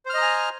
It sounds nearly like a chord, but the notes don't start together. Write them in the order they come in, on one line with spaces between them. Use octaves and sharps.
C5 F6 D#5 A#5 G#5